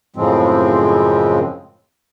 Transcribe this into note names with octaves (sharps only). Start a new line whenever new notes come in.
F#2 A2 C#3 F3 G#3 C4